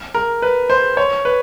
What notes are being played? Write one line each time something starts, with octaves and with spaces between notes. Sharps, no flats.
A#4
B4
C5
C#5
B4